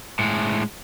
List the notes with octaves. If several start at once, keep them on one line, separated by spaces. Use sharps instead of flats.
A2 G#3